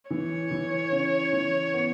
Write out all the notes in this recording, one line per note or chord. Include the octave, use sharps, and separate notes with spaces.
E3 C#5
E3
C#3
E3
B3